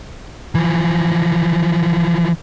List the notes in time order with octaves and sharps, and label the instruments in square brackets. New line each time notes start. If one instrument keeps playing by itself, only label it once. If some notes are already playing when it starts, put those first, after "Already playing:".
[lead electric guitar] E3 F3